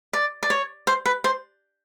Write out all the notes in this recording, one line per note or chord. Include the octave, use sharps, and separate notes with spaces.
D5
D5
C#5
C5
B4
C5